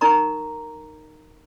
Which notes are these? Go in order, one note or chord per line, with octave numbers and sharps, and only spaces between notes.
D#4 A#4 A#5 C#6